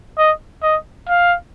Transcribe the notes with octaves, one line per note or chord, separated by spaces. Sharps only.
D#5
D#5
F5